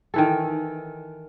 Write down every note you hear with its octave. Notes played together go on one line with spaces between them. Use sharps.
D#3 E3 A4